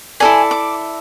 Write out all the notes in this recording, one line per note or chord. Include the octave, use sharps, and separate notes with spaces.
E4 A4 D5 G#5
D6